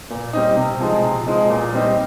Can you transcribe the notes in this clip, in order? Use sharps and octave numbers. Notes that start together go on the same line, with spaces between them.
A#2
G3 C4 D#4
C3
F3 G#3 D#4
C3
F3 G#3 D#4
A#2
G3 C4 D#4